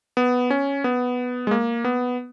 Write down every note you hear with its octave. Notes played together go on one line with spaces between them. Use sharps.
B3
C#4
B3
G#3
A#3
B3